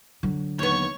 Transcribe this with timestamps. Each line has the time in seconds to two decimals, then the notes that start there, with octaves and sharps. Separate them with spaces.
0.23 D3 F#3
0.59 D#2 B3 C#5 C#6